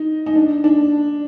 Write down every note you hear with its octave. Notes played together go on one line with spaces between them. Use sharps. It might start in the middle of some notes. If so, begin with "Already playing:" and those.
Already playing: D#4
D#4
D4
D4